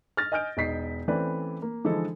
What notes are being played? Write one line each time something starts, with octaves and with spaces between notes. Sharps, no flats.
F6 A6 A#6
D#5 G#5 D#6 F6 G6 D7
E1 D#4 B6 C7
E3 A3 C4 C#4 B4 D5
A#3
D3 E3 F3 G#3 D#4 A4